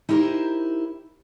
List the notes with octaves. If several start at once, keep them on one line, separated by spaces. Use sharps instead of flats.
D#4 E4 G4 A#4 C5